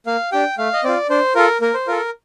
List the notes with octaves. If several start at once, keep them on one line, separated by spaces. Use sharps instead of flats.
A#3 F5
D4 G4 G5
A3 F5
D#5
C4 F4 D5
D4 C5
F4 A4 A#4
A#3 A#4
C5
F4 A4 A#4